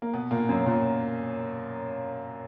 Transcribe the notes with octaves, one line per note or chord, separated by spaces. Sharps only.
A#3
B2 B3
A#2 A#3
F#2 F#3
A#2 A#3